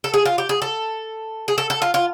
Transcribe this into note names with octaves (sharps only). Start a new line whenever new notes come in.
A4
G#4
F4
G4
G#4
A4
G#4
A4
A4
F4
F4